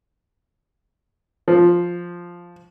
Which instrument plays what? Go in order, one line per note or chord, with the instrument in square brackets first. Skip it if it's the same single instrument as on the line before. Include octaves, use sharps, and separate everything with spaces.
[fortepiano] F3